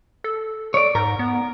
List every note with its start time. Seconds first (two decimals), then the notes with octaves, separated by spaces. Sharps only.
0.24 A4
0.74 C#5 D5
0.95 G#2 A#4
1.19 B3